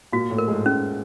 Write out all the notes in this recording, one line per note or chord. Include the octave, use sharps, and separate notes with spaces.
A#2 A#3 F#4
A2 A3
A#4
G#2 G#3
G#2 G#3 C#4